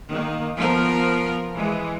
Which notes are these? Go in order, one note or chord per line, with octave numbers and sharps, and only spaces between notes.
D#3 A#3
F3 B3 A#4
E3 G#3